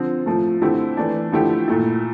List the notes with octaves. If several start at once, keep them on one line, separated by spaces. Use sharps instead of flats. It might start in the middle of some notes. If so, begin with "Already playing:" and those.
Already playing: D3 F3 C4
A2 F3 A3
D3 A3 C4 E4 G4
E3 A3 D4
D3 F3 A3 E4 G4
A#2 A3 E4